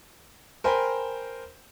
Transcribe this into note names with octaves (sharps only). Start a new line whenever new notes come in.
A#4 C5 G5 G#5 B5